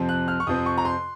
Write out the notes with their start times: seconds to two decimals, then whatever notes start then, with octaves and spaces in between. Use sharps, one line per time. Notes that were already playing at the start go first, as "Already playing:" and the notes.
Already playing: F2 C3 F3 C4
0.09 F#6
0.28 F6
0.40 C#6
0.47 F2 C3 F3 C4 D#6
0.66 C#6
0.78 A#5
0.85 C6